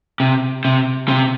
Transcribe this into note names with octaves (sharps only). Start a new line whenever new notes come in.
C3
C3
C3